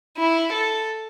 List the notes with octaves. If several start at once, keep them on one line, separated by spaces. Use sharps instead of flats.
E4
A4